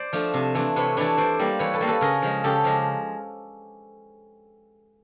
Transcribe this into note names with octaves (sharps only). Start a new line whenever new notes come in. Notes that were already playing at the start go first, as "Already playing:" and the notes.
Already playing: C5 D5
F3 A3 D4
C3
E3 A3 D4
C3 B4 C#5
E3 A3 D4 B4 C#5
E3 C5 D5
G3 A#3
E3 B4 C#5
A4 B4
G3 A#3
A4 B4
C#3 G#4 A#4
F3 G#3
C#3 G4 A4
F3 G#3